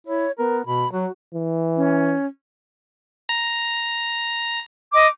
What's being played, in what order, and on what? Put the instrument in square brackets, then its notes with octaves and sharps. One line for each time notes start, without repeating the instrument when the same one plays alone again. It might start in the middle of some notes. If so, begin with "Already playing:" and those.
[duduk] E4 [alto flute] C#5
[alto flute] B3 [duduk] A#4
[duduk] B2 [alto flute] B5
[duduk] F#3 [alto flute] F#4
[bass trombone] E3
[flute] C#4
[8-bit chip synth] A#5
[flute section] D#5 D6